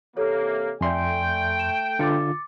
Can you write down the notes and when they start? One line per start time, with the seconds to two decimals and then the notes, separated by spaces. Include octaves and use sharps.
0.17 C3 E3 A#3 G4 A4 C#5
0.81 F2 A3 D5 E5 G5 G#5 C6
1.59 E7
1.99 D3 F4 D6 A6 C#7